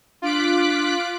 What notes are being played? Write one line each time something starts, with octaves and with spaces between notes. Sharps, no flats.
D4 F4 D6 F#6 B6 D7